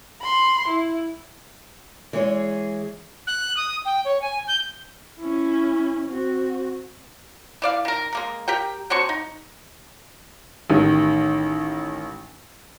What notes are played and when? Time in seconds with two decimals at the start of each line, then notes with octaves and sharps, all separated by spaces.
0.21 B5 C6
0.68 E4
2.13 E3 G#3 G#4 C#5
3.27 F#6
3.57 D#6
3.85 G5
4.05 C#5
4.22 G#5
4.47 G6
5.19 C#4 E4
6.07 C4 F#4
7.62 E3 D5 F5
7.85 D#3 A#4
8.13 G#3 A#3 A#4
8.48 G4 A#4 G5
8.90 D3 F#3 C4 C#6
9.09 D#4
10.70 A1 D#3 G4